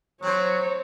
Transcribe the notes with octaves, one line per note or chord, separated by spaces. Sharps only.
F#3 C4 C5 C#5